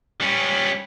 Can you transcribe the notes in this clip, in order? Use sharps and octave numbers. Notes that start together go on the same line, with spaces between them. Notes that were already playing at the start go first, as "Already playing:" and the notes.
G3 C#4